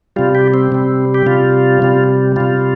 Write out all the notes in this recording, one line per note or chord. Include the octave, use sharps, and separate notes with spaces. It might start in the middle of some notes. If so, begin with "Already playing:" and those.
C3 G3 F4
G4
C4
C3 G3
G4
C3 G3 F4
C3 G3
C3 G3 F4